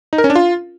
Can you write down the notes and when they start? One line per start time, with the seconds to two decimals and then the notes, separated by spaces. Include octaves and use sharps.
0.13 D#4
0.18 A#4
0.24 C#4
0.30 D4
0.35 F4